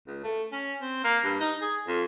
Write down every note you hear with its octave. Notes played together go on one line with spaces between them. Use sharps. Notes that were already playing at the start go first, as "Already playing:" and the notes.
C#2
A3
C#4
C4
A#3
G2
D#4
G#4
F2